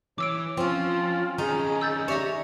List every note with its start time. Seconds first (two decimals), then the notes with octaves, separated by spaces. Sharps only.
0.18 E3 C#5 D6 E6 D7
0.57 F3 C4 C#4 F4
1.38 D#3 C#4 D#4 G#4
1.81 E6 G6 A6
2.08 G4 C#5 D5 E5 A#5